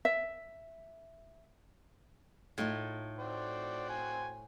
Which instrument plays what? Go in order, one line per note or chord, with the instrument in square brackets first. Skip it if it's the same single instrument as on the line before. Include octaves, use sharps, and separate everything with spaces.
[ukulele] E5
[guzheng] A2 [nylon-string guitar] A3 D#4 F4
[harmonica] F#4 C5 G5 [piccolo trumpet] D5
[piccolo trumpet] G#5